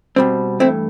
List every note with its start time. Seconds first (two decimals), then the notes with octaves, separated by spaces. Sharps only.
0.16 B2 G3 C4
0.60 G2 E3 A3 C4 E4